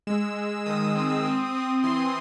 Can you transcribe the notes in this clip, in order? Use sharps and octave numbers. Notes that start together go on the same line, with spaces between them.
G#3 E6
G#3
D#3 D#6
C4
C4
C4
E3 C6